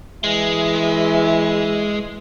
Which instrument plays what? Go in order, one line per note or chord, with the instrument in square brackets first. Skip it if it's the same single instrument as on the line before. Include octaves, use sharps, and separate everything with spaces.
[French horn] E3 [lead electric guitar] G#3 [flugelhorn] E5